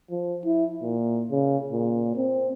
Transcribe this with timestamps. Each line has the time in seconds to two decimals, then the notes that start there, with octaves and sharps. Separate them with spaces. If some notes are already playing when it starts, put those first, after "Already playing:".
0.10 F3
0.45 E4
0.82 A#2
1.31 C#3
1.72 A#2
2.16 C4